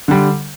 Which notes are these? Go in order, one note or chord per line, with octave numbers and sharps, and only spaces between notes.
D3 G3